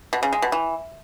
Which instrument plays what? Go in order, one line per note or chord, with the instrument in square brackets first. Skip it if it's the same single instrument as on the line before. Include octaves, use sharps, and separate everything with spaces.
[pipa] B2
C#3
G#3
B2
E3